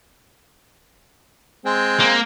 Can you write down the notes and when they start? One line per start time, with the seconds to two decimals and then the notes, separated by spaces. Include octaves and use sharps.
1.65 G#3 C4
2.00 A#3